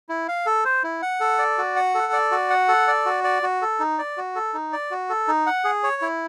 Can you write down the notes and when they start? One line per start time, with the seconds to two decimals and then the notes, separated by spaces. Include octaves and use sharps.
0.09 E4
0.28 F5
0.46 A4
0.65 C5
0.84 E4
1.02 F#5
1.20 A4
1.38 D5
1.58 F#4
1.76 F#5
1.95 A4
2.13 D5
2.31 F#4
2.50 F#5
2.68 A4
2.88 D5
3.06 F#4
3.24 D5
3.43 F#4
3.62 A4
3.80 D#4
3.98 D5
4.17 F#4
4.35 A4
4.54 D#4
4.72 D5
4.91 F#4
5.10 A4
5.28 D#4
5.46 F#5
5.64 G#4
5.83 C#5
6.02 E4